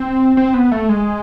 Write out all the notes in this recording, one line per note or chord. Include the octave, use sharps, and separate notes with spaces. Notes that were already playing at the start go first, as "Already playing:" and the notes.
Already playing: C4
C4
B3
A3
G#3